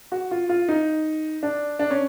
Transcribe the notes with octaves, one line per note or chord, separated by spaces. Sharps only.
F#4
F4
F4
D#4
D4
D4
C#4